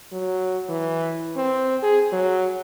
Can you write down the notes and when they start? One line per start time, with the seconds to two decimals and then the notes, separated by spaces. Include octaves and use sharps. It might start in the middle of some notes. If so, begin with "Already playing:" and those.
0.12 F#3
0.69 E3
1.37 C4
1.83 G#4
2.12 F#3